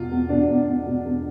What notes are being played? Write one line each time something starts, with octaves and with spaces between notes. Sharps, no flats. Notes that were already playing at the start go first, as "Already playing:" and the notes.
Already playing: E2 B2 F4
E2
B2 D4
E2
E2
B2
E2